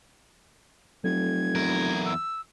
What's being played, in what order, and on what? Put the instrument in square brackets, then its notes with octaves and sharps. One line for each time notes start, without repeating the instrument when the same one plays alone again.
[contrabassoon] F1 [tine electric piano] F#3 A4 [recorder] G#6
[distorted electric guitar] E2 A#4
[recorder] E6